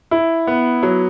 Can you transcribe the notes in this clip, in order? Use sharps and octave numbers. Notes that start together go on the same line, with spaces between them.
E4
B3
F#3